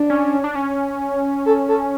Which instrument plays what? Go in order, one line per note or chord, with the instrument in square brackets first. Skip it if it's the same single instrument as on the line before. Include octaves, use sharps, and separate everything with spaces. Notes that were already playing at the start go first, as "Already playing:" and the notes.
Already playing: [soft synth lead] D4
[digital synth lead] C#4
D4
C#4
[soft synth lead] A4
A4